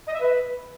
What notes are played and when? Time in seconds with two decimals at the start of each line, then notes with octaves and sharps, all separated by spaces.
0.07 D#5
0.13 E5
0.20 B4